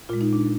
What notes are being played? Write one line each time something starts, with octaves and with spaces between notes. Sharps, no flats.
A#2 G#3 F4
D#4
D4